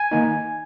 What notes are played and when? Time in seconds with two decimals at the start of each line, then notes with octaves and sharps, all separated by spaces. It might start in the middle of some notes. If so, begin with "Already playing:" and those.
Already playing: G#5
0.11 D#3 A#3 D#4